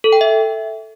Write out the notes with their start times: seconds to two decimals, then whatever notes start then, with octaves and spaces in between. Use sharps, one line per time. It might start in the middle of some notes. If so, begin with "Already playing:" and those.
0.04 A4
0.13 G5
0.21 E5